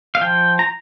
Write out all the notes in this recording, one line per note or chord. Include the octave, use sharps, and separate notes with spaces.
F5
F3 G5
A#5